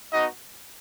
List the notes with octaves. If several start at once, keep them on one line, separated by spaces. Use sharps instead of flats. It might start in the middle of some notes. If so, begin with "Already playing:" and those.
B3 D#4 F#4 D#5